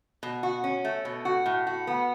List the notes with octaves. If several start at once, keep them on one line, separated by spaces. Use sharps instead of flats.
B2
F#4
C#4
A3
B2
F#4
A2
F#4
B3